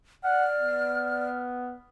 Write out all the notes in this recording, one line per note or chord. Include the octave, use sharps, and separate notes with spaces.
D5 F#5 F6
B3